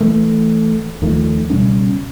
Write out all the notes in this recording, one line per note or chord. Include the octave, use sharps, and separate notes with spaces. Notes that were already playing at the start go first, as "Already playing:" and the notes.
E3 A3
D#2 D#3 F3 A3
C#2 B2 G3 C#4